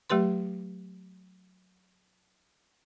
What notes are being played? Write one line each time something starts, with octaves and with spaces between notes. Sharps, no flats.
F#3 A3 G4 B4 C6